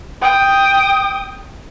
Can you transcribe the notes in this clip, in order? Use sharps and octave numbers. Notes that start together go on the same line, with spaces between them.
G5 D#6